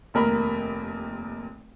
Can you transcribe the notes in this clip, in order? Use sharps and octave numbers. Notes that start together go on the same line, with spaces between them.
F1 D#2 A#4 B5